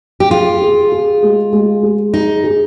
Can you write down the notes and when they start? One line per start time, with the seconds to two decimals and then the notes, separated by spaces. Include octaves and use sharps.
0.20 G4
0.30 F4 G#4
0.62 G#4
0.92 G#4
1.23 G#3
1.53 G#3
1.83 G#4
2.14 D#4 G#4
2.44 G#4